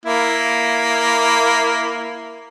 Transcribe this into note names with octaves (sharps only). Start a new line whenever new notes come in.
A#3 E4